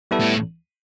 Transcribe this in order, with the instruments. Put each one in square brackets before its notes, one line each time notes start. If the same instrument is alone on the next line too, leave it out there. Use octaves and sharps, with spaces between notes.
[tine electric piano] G3 B3 E4 A4
[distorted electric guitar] A2